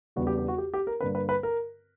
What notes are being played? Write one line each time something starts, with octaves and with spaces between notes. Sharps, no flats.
E2 C#3 G3 B3 D4 F#4
G4
G4
F#4
G4
G4
A#4
G2 D3 A#3 B4
B4
B4
A#4